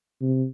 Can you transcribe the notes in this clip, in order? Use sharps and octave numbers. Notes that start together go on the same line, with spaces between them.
C3